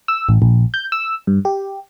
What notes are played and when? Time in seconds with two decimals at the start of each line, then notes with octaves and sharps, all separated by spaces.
0.08 E6
0.29 A1
0.42 A#1
0.74 G6
0.92 E6
1.27 G2
1.45 G4